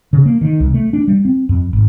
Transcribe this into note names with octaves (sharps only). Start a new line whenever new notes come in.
C#3
A#3
D#3
C2
A3
D4
G3
C4
F2
G#1